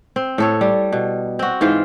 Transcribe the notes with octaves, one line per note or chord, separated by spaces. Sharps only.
C4
A2 A4 C#5
G3
B2
C4 F#4
G#2 E3 F4 C5